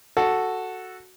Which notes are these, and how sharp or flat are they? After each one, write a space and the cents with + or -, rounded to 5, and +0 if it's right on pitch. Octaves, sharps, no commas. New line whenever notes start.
F#4 +0 A4 +0